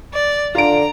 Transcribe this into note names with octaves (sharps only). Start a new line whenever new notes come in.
D5
D3 F4 A#5 D7